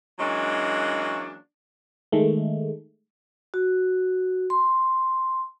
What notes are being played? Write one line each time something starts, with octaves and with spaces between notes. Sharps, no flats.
E3 F#3 G#3 A#3 C#4 D4
D#3 G#3 A3
F#4
C6